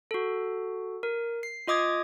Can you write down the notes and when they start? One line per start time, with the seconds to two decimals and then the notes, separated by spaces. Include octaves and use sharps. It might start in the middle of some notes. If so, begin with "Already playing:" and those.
0.11 F#4 A4
1.03 A#4
1.43 C7
1.67 F4 D#5 D6 D#6 G#6